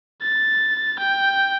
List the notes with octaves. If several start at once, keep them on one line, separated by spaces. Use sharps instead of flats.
A6
G5